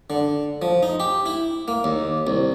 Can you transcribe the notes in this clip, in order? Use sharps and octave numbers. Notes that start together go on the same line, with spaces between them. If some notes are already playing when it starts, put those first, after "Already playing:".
D3
F3
D#4
G4
E4
A#3
D#2
C2